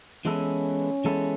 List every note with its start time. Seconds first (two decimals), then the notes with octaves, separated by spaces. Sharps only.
0.25 E3 G#3 B3 C#4 E4 A4
1.04 E3 G#3 B3 E4 A4